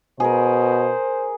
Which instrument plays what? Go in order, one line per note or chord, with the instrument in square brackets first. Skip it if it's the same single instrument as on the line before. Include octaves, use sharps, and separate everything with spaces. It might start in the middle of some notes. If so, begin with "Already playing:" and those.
[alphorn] B2 [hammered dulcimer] G#4 A#4 [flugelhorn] C5